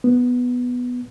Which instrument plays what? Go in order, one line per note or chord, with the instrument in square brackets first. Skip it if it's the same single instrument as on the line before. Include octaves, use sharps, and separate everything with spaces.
[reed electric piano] B3